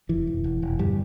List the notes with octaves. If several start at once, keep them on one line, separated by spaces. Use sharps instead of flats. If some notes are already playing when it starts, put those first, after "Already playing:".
E1 E3
E1
E1
E1
G1 G3